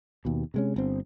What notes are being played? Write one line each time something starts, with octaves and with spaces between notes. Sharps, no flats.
D#2 B2
C3 G#3 C#4
G1 C4